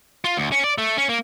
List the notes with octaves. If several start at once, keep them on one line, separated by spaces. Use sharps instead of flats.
F4
D2
C#4
D5
A3
C#4
A#3